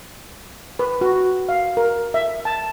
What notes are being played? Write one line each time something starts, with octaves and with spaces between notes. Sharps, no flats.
B4
F#4
F5
A#4
E5
A5